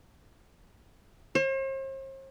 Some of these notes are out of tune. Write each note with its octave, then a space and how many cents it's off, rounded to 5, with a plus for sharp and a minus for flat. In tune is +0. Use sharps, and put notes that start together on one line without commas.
C5 +45